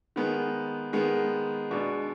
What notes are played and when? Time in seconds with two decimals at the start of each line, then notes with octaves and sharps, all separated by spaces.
0.16 D#3 G#3 B3
0.93 D#3 G#3 B3
1.71 B2 G#3 D4